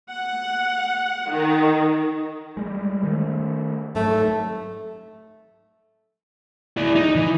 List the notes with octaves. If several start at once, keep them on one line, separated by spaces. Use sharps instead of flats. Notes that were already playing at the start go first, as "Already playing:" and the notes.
F#5
D#3
G3 G#3
D#3 A3
G#2 F#3 A3
E4 D5
D#4
E3